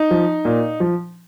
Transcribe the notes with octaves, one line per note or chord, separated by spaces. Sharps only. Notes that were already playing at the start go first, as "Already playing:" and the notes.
Already playing: D#4
F3
A#2
F3